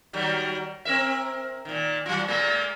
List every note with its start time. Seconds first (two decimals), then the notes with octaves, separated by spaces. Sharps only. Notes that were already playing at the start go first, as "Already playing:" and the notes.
0.13 D#3 F#3 G3
0.85 C4 A#4 E5
1.65 A#2 D#3
2.06 F#3 F4
2.28 A#2 G#3 A#3